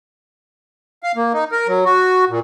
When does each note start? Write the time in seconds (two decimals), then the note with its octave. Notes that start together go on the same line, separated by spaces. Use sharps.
1.03 F5
1.16 A#3
1.33 D#4
1.52 A#4
1.68 F#3
1.85 F#4
2.29 A#2